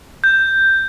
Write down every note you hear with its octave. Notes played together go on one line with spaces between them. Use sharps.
G6